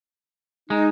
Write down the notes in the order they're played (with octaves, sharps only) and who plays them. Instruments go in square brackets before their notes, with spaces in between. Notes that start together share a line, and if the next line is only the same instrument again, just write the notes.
[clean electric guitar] G#3 [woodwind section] D#4